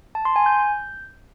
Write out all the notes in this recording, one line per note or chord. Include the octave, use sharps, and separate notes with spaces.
A5
C6
G#5
G6